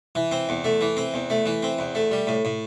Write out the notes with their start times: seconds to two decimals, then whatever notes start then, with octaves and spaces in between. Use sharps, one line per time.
0.15 E3
0.31 C4
0.49 E2
0.64 A3
0.81 E3
0.97 C4
1.14 E2
1.30 A3
1.46 E3
1.63 C4
1.79 E2
1.95 A3
2.11 G3
2.27 A2
2.45 A2